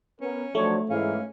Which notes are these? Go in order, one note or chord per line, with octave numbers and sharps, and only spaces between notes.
B3 C#4 A#4
F3 F#3 A3 D4 C#5
G#2 E3 C#4 F5